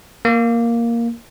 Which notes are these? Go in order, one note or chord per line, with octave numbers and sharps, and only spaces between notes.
A#3